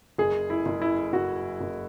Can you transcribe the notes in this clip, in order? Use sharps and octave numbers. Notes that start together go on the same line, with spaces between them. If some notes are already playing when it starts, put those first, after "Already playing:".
F#1 G#4
E4
F#1
E4
F#1 F#4
F#1